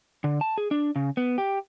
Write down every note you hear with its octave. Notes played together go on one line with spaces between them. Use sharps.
D3
A5
G#4
D4
C#3
B3
G4